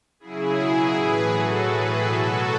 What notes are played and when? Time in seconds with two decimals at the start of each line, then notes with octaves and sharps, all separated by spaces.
0.20 C#3 F#3 E4 G#4
0.57 B2 F#3
0.94 A2 E3 G#4 B4
1.31 A2 F#3 F#4 A4
1.69 A2 E3 G#4 B4
2.05 B2 F#3 F#4 A4